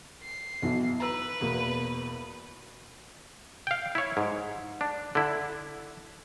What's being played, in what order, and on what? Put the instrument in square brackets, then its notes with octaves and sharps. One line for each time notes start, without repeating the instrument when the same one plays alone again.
[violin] C7
[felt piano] B1 B2 E3
[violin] B4 [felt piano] A#5 E6
[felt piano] E2 B2 A#3
[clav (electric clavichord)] F5 G5
E4 C#5
G#2
D4
D3 E4